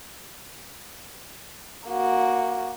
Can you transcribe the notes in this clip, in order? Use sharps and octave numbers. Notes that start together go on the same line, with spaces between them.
A#3 F#4